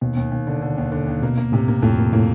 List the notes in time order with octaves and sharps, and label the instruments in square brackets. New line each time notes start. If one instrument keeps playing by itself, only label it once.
[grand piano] D#2 [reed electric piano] B2
[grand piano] D#2
D#2
D3
D3
D#2
D3
D#2
[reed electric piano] B2 [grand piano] A#3
[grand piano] A#3
[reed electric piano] A2 [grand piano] C3
[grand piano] A#3
[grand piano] F2 [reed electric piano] A2
[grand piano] A#3
[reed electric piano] A2 [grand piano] A#3